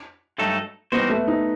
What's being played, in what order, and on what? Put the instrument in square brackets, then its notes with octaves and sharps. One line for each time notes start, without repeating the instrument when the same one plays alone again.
[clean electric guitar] G2 F#3 A3 D#4 A4
[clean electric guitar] E3 G3 D#4 F#4 C5 [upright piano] B3
[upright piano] A3
D#4